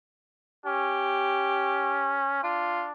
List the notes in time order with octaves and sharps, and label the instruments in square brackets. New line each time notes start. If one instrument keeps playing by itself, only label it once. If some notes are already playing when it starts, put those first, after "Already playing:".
[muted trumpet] C#4 [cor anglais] G4
[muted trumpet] D4 [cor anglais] F4